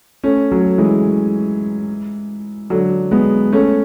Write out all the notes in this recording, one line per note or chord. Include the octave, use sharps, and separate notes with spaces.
A3 C#4
F#3 A3
E3 G#3
D3 F#3
G#3 B3
A3 C#4